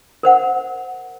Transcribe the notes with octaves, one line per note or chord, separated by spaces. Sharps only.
A#4 C5 F#5